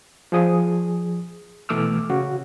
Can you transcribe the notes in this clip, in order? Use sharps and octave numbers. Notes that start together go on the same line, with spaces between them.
F3 G#4 D#6
B2 E3 A3 D6 E6 F6
C#3 F#4